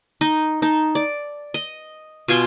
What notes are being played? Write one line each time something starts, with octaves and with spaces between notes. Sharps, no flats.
D#4 D#5
D#4 A5
D5
D#5
B2 F4 G#5 C6